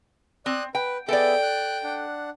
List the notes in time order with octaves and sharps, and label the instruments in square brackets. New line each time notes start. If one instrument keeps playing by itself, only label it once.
[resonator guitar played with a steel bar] C4 [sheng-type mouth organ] D5 D#6 F#6
[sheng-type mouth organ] B4 [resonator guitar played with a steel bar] G5
[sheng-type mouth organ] B3 G#4 E5 [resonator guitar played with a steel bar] A4 D5 [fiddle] G5
[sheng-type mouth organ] F#6
D4 F#5